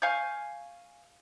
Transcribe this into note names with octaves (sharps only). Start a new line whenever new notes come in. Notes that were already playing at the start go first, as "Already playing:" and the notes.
F5 G#5 C#6 G6